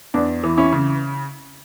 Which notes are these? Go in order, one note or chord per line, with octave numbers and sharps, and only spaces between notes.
E2 D4
E3
C#4 E4
C#3